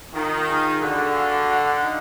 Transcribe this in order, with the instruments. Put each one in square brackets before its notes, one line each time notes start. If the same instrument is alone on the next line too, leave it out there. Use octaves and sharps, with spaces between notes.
[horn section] D#3 [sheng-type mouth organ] F4
[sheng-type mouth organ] G#4
[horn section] D3 [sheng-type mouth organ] F#4
[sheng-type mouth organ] F5
F#5
D#4